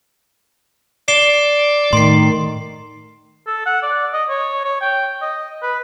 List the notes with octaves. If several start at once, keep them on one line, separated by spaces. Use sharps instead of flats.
D5 C7 E7 G7
A2 D#3 C6 C7
A4
F#5
D5
D#5
C#5
C#5
G5
D#5
B4